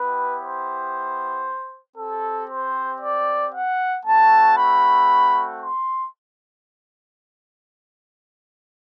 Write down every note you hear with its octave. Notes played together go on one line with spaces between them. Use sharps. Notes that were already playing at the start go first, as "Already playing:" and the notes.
Already playing: B3 E4 G4 B4
C5
C4 G4 A4
C5
D5
F#5
A3 C4 F#4 A5
B5
C6